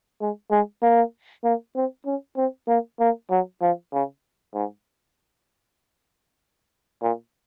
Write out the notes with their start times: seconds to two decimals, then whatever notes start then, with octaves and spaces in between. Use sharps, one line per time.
0.21 G#3
0.51 G#3
0.83 A#3
1.44 A#3
1.76 C4
2.06 C#4
2.37 C4
2.68 A#3
3.00 A#3
3.30 F#3
3.61 F3
3.93 C#3
4.54 G#2
7.02 A#2